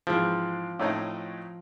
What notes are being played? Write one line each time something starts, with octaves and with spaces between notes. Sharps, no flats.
G#2 E3 F3 G#3 C4
A2 F#3 A3 C4 D#4